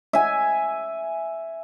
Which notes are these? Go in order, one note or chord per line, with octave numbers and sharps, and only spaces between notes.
E5 G#5